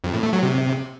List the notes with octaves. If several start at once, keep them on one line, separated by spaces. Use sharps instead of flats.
F2
A2
A3
F#3
C3